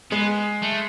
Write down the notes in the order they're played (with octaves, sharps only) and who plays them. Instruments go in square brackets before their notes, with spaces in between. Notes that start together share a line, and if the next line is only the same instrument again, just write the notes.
[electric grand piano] G#3 [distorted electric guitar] B3
[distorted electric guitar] A3